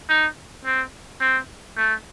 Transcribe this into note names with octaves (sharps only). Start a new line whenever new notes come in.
D#4
C4
C4
A3